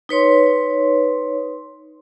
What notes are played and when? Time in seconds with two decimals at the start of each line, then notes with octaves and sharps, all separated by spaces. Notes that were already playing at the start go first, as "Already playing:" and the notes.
0.09 D#4 B4 C#5 C6